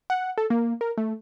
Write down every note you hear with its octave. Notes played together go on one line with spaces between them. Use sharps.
F#5
A4
A#3
A#4
A3